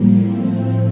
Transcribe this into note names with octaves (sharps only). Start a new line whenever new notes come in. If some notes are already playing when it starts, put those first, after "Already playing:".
Already playing: A2 F3 G3 A#3
A2 F3 A3 C4